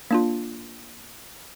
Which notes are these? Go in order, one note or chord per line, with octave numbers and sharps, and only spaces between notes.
A#3 D4 F4